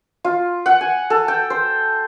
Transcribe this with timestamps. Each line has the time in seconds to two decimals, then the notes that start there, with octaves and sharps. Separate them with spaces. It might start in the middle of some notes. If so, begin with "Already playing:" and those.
0.24 F4
0.66 F#5
0.81 G#5
1.10 A4
1.28 G5
1.50 C5